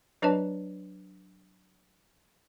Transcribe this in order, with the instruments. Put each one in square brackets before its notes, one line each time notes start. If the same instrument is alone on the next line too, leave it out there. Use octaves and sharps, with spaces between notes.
[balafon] F#3 D4 B4 C#5 D#5 A5